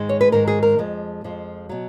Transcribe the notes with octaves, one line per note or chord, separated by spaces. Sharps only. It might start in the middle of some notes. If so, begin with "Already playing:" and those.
Already playing: G#2 D#3 G#3
C#5
B4
G#2 D#3 G#3 A#4
G#4
A#4
F2 F3 G#3
F2 F3 G#3
B2 F#3